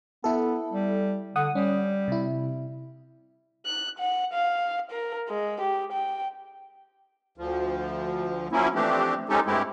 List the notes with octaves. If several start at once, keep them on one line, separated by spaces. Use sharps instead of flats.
B3 E4 A4
G3
D3 F#5 D#6
G3 C#4
C3 E4
F#6
F#5
F5
A#4
G#3
G4
G5
D2 F3
F3 F#3 A#3 C#4 E4
E3 F3 A3 C4 D4 G4
G#3 C4 C#4 D#4 G4 A4
G2 G#3 A3 C4 E4 G4